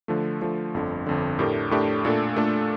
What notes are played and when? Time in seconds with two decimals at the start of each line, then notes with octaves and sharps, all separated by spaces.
0.08 D3 F3 A3
0.41 D3 F3 A3
0.74 G1 F2 D3
1.06 G1 F2 D3
1.39 A2 A3 D4 G4 A#4
1.71 A2 A3 D4 G4 A#4
2.05 A#2 A3 D4 A4
2.36 A#2 A3 D4 A4